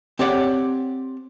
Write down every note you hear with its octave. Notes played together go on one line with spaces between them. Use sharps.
C4 G4 C#5 D5 F#5